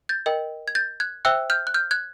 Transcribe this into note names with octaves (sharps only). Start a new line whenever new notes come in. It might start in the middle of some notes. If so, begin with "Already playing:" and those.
G6 A6
A#4 D#5 G5
G#6
G6 A6
F#6 G#6
C5 E5 G5 E6 F#6
F6 G6
F#6
F6 G6
F#6 G#6